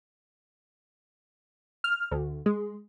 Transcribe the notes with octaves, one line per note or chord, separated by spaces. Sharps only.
F6
D2
G#3